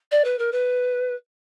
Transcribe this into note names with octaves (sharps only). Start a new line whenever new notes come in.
D5
B4
A#4
B4